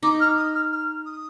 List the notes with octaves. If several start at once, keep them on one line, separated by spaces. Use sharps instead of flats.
D#4 D6
F6
D#6
F6
F6
D#6